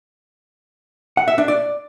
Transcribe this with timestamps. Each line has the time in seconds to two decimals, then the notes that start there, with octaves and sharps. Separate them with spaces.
1.17 F#5
1.28 E5
1.38 D4
1.48 D5